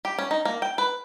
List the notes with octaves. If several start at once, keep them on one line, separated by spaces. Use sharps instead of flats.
G4
C#4
D#4
A#3
G5
B4